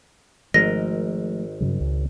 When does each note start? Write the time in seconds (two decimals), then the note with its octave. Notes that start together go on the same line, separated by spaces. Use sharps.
0.54 G#1 F3 G#3 A3 A#4 D#5 A#6
1.60 G2 C#3 F#3
1.81 C#2